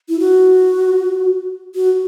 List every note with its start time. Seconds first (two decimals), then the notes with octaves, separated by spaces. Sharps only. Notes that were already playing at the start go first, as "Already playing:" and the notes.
0.09 E4
0.20 F#4
1.75 F#4